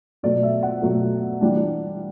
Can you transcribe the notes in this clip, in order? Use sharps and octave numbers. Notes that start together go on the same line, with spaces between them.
B2 F#3 A3 D5
E5
F#5
B2 F#3 A3
E3 G3 D4